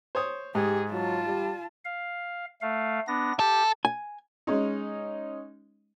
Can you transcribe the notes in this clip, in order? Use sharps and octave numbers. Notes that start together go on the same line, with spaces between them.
C5 C#5 D#6
G#2 G4 G#4
F#3 F4 A5
G3
F5
A3 F5
B3 D4 A#6
G4 A4
G#5
G#3 C#4 D#4